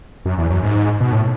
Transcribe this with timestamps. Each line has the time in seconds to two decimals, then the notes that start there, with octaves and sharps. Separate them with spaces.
0.26 F#2
0.38 E2
0.50 F#2
0.63 G#2
1.01 B2
1.12 A2